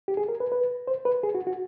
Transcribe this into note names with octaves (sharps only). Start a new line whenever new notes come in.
G4
G#4
A#4
B4
B4
C5
B4
G#4
F#4
F#4